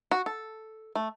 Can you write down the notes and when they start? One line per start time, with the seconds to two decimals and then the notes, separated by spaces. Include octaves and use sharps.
0.11 F#4
0.26 A4
0.95 A3